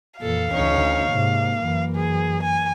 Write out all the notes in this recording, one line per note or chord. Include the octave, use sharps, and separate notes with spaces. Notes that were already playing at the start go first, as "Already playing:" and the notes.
F2 A#2 E3 A4 F5
D2 C#4 D#4 C#5
G#2 C3 A#3
F#2 E3
G#4
G#5